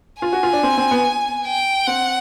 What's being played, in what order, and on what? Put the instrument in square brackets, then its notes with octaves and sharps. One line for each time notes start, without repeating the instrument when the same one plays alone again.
[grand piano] F4 [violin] G#5
[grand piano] F#4
F4
D4
C4
C4
B3
[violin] G5
[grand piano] C4 [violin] F#5